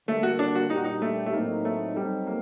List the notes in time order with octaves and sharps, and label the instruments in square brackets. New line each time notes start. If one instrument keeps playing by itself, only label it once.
[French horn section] D3 G3 A#3 [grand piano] A3
[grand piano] F#4
D4
F#4
[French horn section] A#2 G3 D4 G4 [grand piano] D#4
[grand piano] F#4
D#4
A3
A3
[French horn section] A2 F#3 C4 D#4 [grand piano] A#3
[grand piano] A3
[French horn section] F#3 C4 D#4 A4 [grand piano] G3
[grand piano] A#3